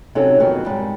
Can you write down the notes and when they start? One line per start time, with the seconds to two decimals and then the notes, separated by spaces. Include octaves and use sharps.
0.15 C3 F#3 C#4 D#4 A4
0.40 F2 B2 D#3
0.65 G#2 G3